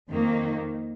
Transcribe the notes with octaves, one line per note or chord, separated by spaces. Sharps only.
F2 D#3 A#3